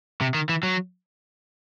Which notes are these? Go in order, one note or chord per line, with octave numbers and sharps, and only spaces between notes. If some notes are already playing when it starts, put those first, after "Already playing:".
C3
D#3
E3
F#3